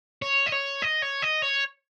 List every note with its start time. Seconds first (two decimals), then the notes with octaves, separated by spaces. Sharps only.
0.22 C#5
0.46 D#5
0.52 C#5
0.82 D#5
1.02 C#5
1.22 D#5
1.42 C#5